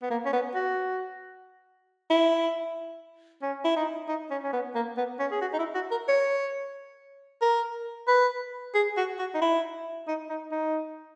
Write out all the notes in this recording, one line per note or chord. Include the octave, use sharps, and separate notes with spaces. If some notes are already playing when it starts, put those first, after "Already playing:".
B3
A#3
C#4
B3
F#4
E4
C#4
E4
D#4
D#4
C#4
C#4
B3
A#3
B3
C#4
G#4
F#4
D#4
E4
F#4
A#4
C#5
A#4
B4
G#4
F#4
F#4
D#4
E4
D#4
D#4
D#4